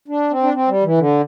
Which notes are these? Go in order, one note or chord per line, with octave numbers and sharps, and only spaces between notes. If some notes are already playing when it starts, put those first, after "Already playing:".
D4
C4
D4
C4
G3
E3
D3